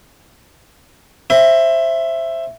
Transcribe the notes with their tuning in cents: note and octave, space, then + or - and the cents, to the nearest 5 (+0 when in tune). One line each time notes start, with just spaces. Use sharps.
C5 +25 E5 +10 B5 +30